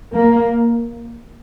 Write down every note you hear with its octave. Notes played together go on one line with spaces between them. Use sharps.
A#3